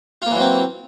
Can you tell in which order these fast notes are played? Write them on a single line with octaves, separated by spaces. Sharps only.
F4 A#3 E3 F#3 C4